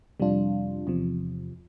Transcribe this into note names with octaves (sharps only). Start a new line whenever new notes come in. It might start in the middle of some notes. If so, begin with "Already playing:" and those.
F2 C3 G3 D4 F4
E2 C3 F3